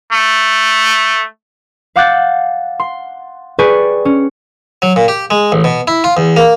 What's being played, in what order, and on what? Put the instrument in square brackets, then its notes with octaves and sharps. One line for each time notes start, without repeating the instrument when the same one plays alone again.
[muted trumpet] A3
[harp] F5 F#5 D6 F#6 G6 A6
C6
G4 G#4 B4 D5 G#5 C#6
C#4
[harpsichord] F#3
A#2
G4
G#3
A1
B2
E4
F4
E2
A#3